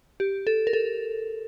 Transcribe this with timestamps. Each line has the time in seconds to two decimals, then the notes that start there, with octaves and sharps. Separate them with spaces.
0.20 G4
0.47 A4
0.67 A#4
0.73 A4